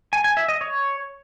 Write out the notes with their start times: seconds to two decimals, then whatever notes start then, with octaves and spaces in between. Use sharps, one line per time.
0.13 G#5
0.24 G#5
0.37 E5
0.48 D#5
0.61 C#5